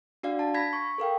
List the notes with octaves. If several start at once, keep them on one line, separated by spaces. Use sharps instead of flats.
D4 F#4 D5 F5
A5
B5 G#6 A#6 B6
C#6
A4 A#4 F5 G5